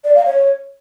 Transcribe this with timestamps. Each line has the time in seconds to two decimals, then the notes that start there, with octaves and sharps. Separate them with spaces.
0.04 D5
0.15 F5
0.26 C#5